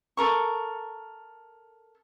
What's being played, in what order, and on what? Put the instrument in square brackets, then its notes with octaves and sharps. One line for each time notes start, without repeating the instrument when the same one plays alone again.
[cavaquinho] A4 A#4 C#6